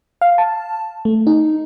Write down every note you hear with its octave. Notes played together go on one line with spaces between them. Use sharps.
F5
A5
A3
D#4